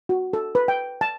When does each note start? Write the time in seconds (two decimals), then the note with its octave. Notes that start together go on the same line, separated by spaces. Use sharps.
0.09 F#4
0.33 A4
0.55 B4
0.68 G5
1.01 A5